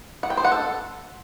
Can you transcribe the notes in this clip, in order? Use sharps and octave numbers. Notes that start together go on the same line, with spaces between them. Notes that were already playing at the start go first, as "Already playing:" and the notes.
F#5
G5
C5
F#5
A4